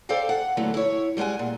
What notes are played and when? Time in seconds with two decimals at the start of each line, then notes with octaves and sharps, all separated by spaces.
0.09 A4 C5 D5 F5 G5
0.29 F#5
0.57 A#2 D3 E3 F#3 A3 B3
0.74 E4 C#5
1.17 G3 G#3 G#4 F#5 G#5
1.39 A#2